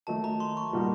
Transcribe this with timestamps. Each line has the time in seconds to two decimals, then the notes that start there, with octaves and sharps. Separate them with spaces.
0.07 D#3 F#3 A3 A5
0.24 A#5
0.40 C6
0.57 C#6
0.73 A#2 G3 A#3 D#4 F#4